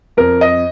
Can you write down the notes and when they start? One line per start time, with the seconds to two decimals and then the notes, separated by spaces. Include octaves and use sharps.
0.17 F2 A#4
0.41 D#5